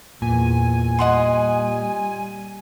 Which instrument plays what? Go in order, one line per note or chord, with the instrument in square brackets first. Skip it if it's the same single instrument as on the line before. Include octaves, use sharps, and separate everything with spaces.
[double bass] E2 [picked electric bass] A#2 [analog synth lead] G#5
[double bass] G3 [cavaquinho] D#5 F#5 C6